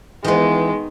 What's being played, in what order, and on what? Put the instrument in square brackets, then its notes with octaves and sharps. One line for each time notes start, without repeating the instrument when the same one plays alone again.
[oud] D#3 B3 [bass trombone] E3 [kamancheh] G#3